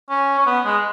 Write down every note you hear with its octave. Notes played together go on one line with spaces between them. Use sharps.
C#4
C#4
B3
G#3